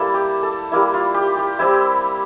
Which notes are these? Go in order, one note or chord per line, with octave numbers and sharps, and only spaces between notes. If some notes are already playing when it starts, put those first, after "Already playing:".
Already playing: G3 A#3 E4 A4
G4
A4
G3 A#3 E4
F4
G4
G4
G3 C4 E4